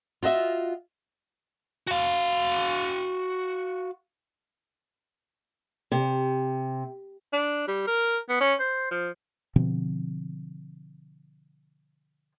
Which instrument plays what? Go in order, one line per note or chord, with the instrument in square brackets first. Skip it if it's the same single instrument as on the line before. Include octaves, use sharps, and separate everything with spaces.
[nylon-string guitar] F4 F#4 D#5 E5
[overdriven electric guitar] F#4 F5
[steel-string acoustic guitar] C3
[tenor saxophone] D4
G3
A#4
B3
C#4
C5
F3
[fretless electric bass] B2 D3 F3 C4